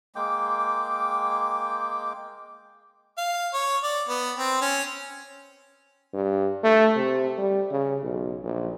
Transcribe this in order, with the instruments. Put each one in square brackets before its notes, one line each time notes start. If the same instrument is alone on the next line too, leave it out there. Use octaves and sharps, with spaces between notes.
[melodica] G#3 A#3 G5 D6
[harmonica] F5
C#5
D5
B3
C4
C#4
[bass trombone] G2
A3
C3
G3
C#3
B1
A#1